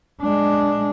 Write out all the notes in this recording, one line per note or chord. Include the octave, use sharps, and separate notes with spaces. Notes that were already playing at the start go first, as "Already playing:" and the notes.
G#3 D4